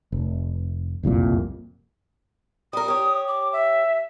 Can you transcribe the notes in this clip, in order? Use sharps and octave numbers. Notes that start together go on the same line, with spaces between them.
F1
F#1 C2 F2 A#2
G3 A#4 D#6
G4 C#5
D6
E5